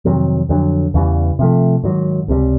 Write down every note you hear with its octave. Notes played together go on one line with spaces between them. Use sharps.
F2 C3 D#3 F#3
F2 D3 F#3
E2 C#3 E3 G3
C3 F3 A3
G#2 D#3 F#3
C#2 C3 D#3 G3